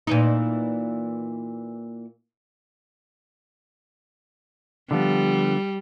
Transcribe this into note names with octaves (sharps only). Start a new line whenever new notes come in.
A#2 E3 D#4
D3 F3 G3 B3